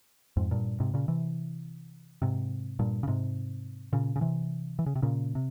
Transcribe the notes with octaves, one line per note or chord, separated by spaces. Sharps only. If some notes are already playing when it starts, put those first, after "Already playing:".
F2 G#2
G2 A#2
G#2 C3
A#2 C#3
C3 E3
G#2 C3
G2 A#2
C#3
G#2 C3
A#2 C#3
C#3
C3 E3
E3
C#3
C3
A#2 C#3
C3